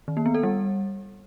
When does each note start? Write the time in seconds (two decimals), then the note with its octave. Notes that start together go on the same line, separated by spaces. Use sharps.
0.08 D#3
0.17 A#3
0.26 B3
0.35 A4
0.43 G3